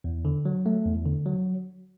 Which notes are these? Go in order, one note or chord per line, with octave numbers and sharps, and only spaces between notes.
E2
D3
F#3
A3
E2
D3
F#3